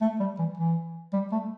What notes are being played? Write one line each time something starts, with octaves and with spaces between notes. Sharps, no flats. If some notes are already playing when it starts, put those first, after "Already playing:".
A3
G3
E3
E3
G3
A3